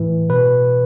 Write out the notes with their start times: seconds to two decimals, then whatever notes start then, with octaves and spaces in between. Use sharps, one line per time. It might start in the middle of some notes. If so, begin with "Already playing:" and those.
Already playing: A2 E3
0.29 B2 B4